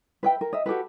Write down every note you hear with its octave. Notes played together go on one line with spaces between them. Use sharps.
B4 E5 G5
A#4
D#5 E5
F#4 G4 A4 B4